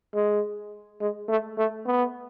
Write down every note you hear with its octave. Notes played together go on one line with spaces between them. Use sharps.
G#3
G#3
A3
A3
B3